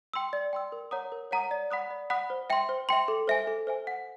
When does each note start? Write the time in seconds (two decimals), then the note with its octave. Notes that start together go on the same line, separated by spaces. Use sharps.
0.14 G5 C6 E6
0.33 D5
0.53 G5 C6 E6
0.72 A#4
0.91 C#5 F#5 A#5 D#6
1.12 A#4
1.31 C#5 F#5 A#5 D#6
1.51 D5
1.71 F#5 B5 D#6 F#6
1.91 D5
2.10 F#5 B5 D#6 F#6
2.30 C5
2.50 E5 G5 C6
2.69 C5
2.89 E5 G5 C6
3.08 A4
3.28 C5 E5 G#5
3.47 A4
3.67 C5 E5 G#5
3.87 F#5